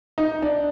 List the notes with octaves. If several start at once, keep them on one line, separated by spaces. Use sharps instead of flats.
D#4
D4